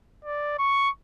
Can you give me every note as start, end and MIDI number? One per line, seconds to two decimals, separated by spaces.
0.25 0.58 74
0.59 0.89 85